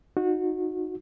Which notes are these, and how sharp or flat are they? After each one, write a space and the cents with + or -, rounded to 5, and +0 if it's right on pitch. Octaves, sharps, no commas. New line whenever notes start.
D#4 +0 F#4 -25